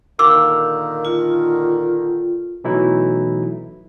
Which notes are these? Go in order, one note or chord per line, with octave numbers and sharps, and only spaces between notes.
A#2 D3 D#3 F5 D6 E6
F4
B2 E3 F#3 A3 D#4 E4